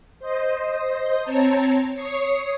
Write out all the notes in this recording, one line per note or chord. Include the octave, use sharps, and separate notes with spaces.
C5 D#5
C4 C#5 A5 A#5
C#5 C#6 D#6 C7